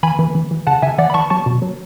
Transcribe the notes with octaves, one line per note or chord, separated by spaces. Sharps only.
E3 G#5 B5
E3
E3
E3
C#3 F#5 A5
C#3 E5 G#5
E3 D5 F#5
B5
E3 A5 C#6
F#3 A5 C#6
B2
F#3